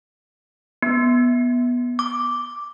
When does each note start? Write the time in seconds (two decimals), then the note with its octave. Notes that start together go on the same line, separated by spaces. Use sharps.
0.82 B3
1.99 D6